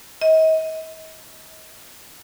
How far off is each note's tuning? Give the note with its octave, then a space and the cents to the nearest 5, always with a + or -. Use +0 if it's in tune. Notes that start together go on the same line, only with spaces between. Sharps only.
D#5 +40